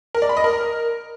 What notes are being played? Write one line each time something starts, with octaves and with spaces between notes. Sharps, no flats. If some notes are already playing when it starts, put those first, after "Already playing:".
A#4
D5
B5
D#5
A#4